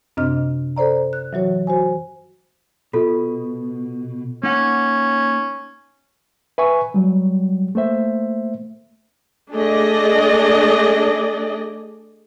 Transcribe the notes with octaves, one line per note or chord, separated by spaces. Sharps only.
F#2 C3 C4 D4 D#5 F6
A4 C5 D5 A#5
F#6
E3 F#3 F#4 C#5
F#4 C5 G#5
B2 F4 A4
A#3 C#4 D#4 F#5
B4 E5 G#5 C#6
F#3 G3
A3 A#3 C5 E5
A3 D4 G#4 D5 D#5